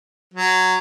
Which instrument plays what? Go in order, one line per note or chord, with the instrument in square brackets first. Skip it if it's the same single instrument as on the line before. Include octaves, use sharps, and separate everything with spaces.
[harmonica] F#3